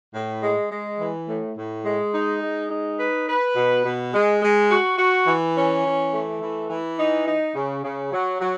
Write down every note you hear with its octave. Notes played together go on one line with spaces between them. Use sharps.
A2
G#3
G#3
E3
A2
A2
G#3
D#4
G#3
D#4
B4
B4
B2
B2
G#3
G#3
F#4
F#4
E3
C#4
E3
A3
E3
E3
D#4
D#4
C#3
C#3
F#3
F#3